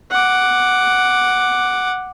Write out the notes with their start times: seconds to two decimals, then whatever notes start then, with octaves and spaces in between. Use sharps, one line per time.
0.11 F#5 D6